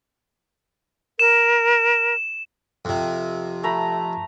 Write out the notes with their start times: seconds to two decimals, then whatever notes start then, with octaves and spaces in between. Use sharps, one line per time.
1.19 A#4 E7
2.85 F2 C3
3.63 A3 A#5 B5